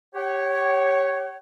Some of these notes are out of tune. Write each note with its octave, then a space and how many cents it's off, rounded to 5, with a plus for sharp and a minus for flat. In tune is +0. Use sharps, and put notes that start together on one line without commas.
G4 +0 C#5 -5 F#5 +45